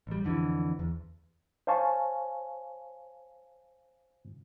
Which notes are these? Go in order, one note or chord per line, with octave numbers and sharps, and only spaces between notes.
A1 G3
F2 D3 E3
E2
C5 C#5 F5 G#5 A5 C#6